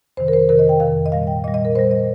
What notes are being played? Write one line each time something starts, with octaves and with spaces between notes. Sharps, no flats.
F2 C3 D#3 C5
A#4
C5
F2 C3 D#3 A#4
D#5
G5
F2 C3 D#3 F5
D#5
A#2 G3 F5
G5
A#2 G3 D#5
D#5
A#4
A#2 G3 C5
D#5